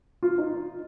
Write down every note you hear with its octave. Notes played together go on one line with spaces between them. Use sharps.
F4
D#4